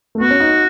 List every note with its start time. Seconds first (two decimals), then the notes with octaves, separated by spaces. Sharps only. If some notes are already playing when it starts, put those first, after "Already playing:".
0.15 A3
0.20 B3 F#4
0.31 C#4
0.40 D#4